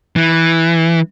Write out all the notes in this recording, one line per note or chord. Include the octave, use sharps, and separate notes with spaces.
E3